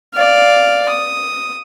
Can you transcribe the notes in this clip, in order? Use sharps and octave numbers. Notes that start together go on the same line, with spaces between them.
D5 F5
D#6